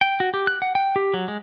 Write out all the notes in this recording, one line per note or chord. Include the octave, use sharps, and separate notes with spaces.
G5
F#4
G4
F#6
F#5
G5
G4
F#3
G#3